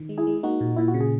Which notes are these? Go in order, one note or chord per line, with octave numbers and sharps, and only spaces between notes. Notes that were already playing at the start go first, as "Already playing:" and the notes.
Already playing: D#3
G#3
E4 G#4
G#3
A#3 D#4 F#4
A#2
A#2 E4
F#4
C#3
G#4